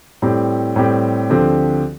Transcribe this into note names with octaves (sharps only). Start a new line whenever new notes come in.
A2 G3 C4 G4
A2 G3 C4 G4
D2 D3 F3 C4 G4